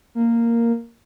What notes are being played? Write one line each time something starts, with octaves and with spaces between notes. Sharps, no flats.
A#3